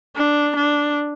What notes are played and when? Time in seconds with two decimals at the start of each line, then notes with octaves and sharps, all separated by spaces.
0.16 D4
0.56 D4